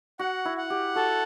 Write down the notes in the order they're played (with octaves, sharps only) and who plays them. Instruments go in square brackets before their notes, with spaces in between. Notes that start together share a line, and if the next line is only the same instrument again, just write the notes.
[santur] F#4 [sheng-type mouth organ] F#5
[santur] E4
[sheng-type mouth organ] F#5
[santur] G4
[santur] F#4 [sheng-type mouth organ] A4